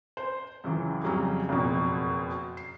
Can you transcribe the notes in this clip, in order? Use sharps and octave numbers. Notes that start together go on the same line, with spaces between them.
C5
C#2 F#2 E3
F2 C#3 F#3 G3 C#4 A#5
F#1 F2 B2
C7